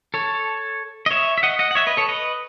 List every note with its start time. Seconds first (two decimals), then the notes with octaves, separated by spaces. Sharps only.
0.14 A4 C#5
1.06 D#5
1.11 C#5 E5
1.38 E5
1.43 D#5 F#5
1.59 D#5 F#5
1.71 F#5
1.75 C#5 E5
1.87 B4 D#5
1.97 A4 C#5
2.09 B4 D#5